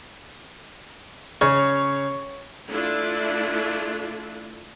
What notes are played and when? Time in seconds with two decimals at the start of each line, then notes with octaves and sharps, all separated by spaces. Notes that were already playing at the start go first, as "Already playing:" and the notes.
1.41 C#3 C#5
2.70 A3 D4 E4 F4